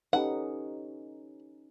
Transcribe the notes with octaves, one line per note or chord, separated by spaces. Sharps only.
C#4 D#4 G4 A4 B4 F#5